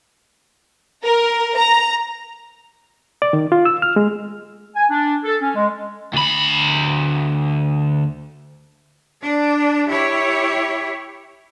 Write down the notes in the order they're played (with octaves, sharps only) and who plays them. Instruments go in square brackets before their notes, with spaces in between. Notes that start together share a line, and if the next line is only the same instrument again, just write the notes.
[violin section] A#4
A#5
[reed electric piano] D5
D#3
F4
E6
F6
G#3
[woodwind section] G#5
D4
A4
C#4
G#3
[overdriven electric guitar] D2 B5
[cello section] D4
E4 G4 C#5